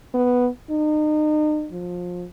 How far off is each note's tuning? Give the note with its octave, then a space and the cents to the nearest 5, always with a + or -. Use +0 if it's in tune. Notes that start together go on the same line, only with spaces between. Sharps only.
B3 +0
D#4 -35
F3 +25